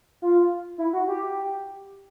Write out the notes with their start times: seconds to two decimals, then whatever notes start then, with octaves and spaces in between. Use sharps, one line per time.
0.22 F4
0.78 E4
0.93 F#4
1.08 G4